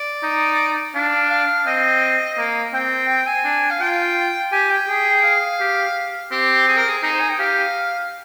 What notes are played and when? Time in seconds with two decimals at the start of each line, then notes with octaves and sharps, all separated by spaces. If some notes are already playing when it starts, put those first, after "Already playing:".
Already playing: D5
0.23 D#4
0.94 D4 F5
1.30 F5
1.66 C4 D#5
2.38 A#3
2.73 C4 G5
3.08 G5
3.27 G#5
3.44 D4
3.70 F5
3.80 F4 G5
4.52 G4 G#5
4.70 G5
4.88 G#4
5.23 F5
5.60 G4
6.31 C4 G4
6.68 G#4
6.77 A#4
6.88 G#4
7.03 D#4 G#4
7.12 C5
7.20 G#5
7.30 G5
7.38 G4 F5